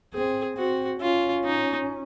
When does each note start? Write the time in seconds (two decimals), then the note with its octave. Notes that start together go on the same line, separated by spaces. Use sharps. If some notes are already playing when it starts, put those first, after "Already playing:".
0.14 C4 G#4
0.57 C4 F#4
1.01 C#4 F4
1.45 D#4